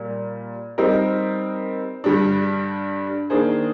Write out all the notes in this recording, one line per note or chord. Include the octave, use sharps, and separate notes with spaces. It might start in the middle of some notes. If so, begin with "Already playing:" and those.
Already playing: A#2 G3 A#3
G3 C4 D#4 A#4
G2 D3 G3 D4
D#3 A#3 D4 G#4 C5